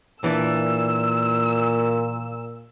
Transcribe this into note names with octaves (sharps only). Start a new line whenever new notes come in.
A#2 E3 D4 E6